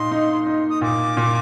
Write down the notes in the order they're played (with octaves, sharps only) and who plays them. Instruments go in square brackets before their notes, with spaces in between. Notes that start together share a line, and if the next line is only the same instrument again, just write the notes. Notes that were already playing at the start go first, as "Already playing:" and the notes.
Already playing: [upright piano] A#2 D#4 [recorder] C6
[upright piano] D#4
D#4
[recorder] D#6
[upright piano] A#2 [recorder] D6
[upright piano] A#2